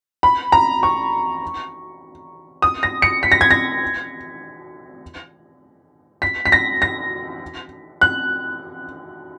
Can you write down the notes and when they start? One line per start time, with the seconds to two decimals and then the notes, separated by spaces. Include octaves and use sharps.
0.23 B5
0.52 A#5
0.83 C#6
2.62 D#6
2.83 A#6
3.02 C#7
3.23 B6
3.32 A#6
3.41 G#6
3.51 A#6
6.22 B6
6.46 B6
6.52 A#6
6.82 A#6
8.01 F#6